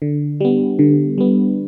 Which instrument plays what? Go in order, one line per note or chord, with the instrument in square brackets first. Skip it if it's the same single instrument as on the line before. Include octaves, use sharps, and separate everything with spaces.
[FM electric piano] D3
G3 B3
D3
G3 B3